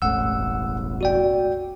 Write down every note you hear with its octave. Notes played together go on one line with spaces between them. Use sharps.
E1 A1 A2 F#5 E6
F#4 D5 G5